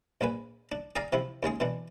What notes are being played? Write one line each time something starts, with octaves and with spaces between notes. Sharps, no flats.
A#1 A#2 B4 G#5
D4
G#4 D5 F5 G#5 A#5
C3 F3 E4
D#2 C#3 G#3 G#4
B2 E3 D4